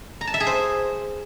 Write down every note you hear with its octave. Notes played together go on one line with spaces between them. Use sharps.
A#5
A5
E5
G#4
C5